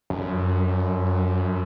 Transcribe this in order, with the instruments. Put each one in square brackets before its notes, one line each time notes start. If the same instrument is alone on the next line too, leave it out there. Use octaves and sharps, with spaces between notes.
[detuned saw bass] F#2